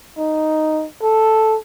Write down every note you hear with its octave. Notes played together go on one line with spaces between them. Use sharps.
D#4
A4